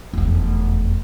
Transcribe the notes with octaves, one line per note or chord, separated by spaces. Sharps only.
F1 E2